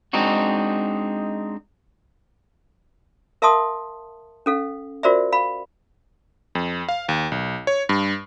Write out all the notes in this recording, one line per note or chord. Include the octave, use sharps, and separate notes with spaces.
G#3 C4 D4 D#4 F#4
A#4 E5 F5 A5 C6 D#6
C#4 A4 F5
F4 F#4 A#4 C5 D5 E5
F5 B5
F2
F5
D#2
B1
C#5
G2